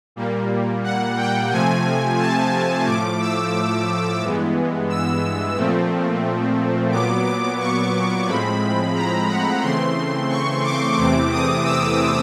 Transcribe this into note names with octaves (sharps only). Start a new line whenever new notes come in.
A#2 G3 A#3
F#5
G5
C3 F3 A3 C4 G#5
A5
A2 F3 A3 D6
E6
G2 E3 G#3 B3
E6
A#2 F3 A3 C4
A#2 F#3 B3 D6
D6
C#6
A2 F3 G#3 C4 B5
A#5
F#5
C#3 E3 A3 C4 C6
C#6
D6
E2 C3 E3 A3 C4 D6
D#6
E6